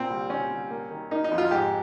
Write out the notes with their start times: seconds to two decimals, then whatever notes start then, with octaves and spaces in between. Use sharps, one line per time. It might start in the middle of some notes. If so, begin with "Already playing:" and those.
Already playing: A#2 C4
0.10 C2
0.30 C2 C#4
0.50 C2
0.71 A#3
0.91 D#3
1.11 A#3 D#4
1.24 D#4
1.31 F2
1.38 F4
1.51 G#2 G4